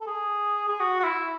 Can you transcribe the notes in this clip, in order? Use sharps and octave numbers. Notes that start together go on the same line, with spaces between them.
A4
G#4
G#4
F#4
F#4
E4